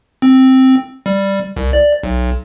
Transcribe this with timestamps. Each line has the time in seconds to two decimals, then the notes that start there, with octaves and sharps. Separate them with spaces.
0.22 C4
1.06 G3
1.57 C2
1.73 D5
2.03 B1